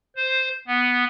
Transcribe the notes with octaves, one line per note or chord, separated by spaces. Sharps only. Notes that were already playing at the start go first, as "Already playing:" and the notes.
C5
B3